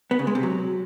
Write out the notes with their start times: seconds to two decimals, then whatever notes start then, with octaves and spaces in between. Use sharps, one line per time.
0.11 B3
0.19 C#3
0.27 G#3
0.35 C3
0.43 F#3